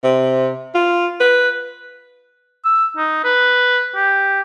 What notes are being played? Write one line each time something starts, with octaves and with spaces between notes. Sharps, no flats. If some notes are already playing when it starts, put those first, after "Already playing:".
C3
F4
B4
E6
D#4
B4
G4